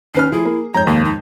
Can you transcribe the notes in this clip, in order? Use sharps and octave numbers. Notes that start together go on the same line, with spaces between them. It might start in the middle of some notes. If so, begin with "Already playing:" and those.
D#2 C#4 B4 F6 C7
F3 A3 E4 G#4
A#3
F2 G#2 C#5 A#5 G6
D#2 A#3
D#4